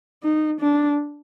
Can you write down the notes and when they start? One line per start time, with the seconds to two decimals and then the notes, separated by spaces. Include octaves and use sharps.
0.23 D#4
0.61 D4